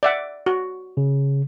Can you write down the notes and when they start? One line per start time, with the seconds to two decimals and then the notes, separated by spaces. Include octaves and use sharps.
0.03 D5 E5 F#5
0.46 F#4
0.97 C#3